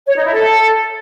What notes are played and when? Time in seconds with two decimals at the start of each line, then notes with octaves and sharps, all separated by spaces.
0.07 C#5
0.16 D#4
0.25 E4
0.33 A4